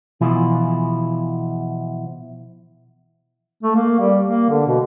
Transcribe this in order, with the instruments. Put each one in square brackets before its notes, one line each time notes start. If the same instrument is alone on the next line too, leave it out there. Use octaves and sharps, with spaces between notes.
[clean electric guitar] B2 E3 F3 E4 F4 G#4
[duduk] A3
A#3
G3
A#3
D3
B2